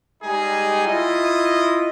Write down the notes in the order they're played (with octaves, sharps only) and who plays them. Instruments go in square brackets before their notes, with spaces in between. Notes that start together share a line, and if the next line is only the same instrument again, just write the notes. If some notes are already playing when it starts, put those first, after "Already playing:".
[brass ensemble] G3 G#3 D#4 G#4
E4 F4 D#5